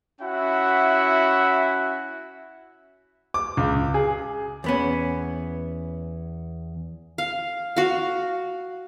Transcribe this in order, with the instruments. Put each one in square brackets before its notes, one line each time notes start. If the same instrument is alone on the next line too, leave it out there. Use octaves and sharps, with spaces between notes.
[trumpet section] C#4 E4 F#4 E5 F#5
[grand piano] D6
C#2
G#4
[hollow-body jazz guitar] E2 B3 C#4
[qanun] F5
F#4 F5